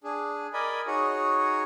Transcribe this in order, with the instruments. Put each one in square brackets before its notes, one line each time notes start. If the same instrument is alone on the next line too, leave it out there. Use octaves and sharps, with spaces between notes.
[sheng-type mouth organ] D4 G#4
A#4 D5 D#5 G#5 B5
D#4 F#4 G#4 C#5